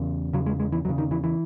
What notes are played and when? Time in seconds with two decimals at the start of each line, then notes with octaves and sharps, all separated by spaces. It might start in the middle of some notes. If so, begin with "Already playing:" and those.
Already playing: E2 C#3
0.33 E2 C#3 F#3
0.46 G#3
0.60 G#3
0.72 E3
0.85 E2 C#3 F#3
0.98 D#3
1.11 E3
1.24 E3